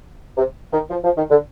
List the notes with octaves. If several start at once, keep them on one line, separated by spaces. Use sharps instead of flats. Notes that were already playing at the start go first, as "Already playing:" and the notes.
C3
D#3
F3
F3
D#3
D3